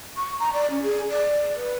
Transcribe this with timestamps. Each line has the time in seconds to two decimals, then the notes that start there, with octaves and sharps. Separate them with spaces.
0.17 C#6
0.40 A#5
0.53 D5
0.70 C#4
0.83 G#4
1.10 D5
1.55 B4